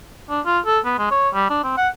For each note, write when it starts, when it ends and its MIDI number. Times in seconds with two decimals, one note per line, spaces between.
0.30 0.41 62
0.46 0.59 65
0.66 0.79 69
0.85 0.94 59
0.98 1.08 56
1.11 1.29 73
1.34 1.48 55
1.50 1.62 62
1.64 1.72 60
1.78 1.88 78